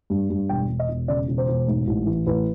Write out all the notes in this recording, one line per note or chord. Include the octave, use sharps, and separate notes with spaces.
G2
G2
E1 G5
E1
D#5
E1
C#3 D5
E1
C5
E1
G#2
A1
E3
A1 B4